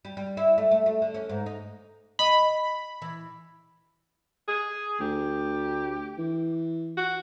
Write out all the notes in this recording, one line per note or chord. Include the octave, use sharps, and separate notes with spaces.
G3
G3
E4
A3
A3
A3
D3
C#4
G#2
D#4
D#5 B5
E3
G#4
D2 G4
E3
F#4